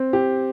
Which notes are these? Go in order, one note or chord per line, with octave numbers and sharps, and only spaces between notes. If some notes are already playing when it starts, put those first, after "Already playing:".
Already playing: C4
G4